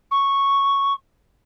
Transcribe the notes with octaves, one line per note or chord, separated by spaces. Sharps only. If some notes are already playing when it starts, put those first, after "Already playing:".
C#6